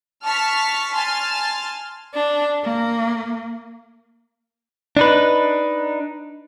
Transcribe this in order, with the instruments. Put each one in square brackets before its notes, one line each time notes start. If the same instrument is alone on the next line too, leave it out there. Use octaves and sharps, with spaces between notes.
[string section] A5 C#6 F6 B6
G#5 A5 C6 F6 A6
[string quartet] D4
A#3
[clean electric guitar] D4 D#4 B4